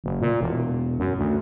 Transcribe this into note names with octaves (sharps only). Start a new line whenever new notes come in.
F#1
A#2
E1
F#2
D2